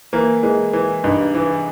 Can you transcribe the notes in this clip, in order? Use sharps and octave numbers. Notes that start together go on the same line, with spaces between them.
E3 A#3
E3 G#3
E3
G2 D#4
E3